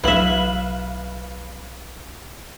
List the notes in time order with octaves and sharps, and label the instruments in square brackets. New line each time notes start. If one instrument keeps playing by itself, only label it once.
[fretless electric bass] B1 F#3 [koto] E4 E5 [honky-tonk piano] B4 F5 F#7